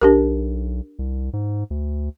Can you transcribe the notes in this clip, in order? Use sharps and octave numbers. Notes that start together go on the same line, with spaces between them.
B1 D4 G4 A#4
C2
G#2
D2